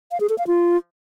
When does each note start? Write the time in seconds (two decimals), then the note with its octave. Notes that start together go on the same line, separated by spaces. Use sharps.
0.11 F5
0.20 G#4
0.29 A4
0.38 F5
0.47 F4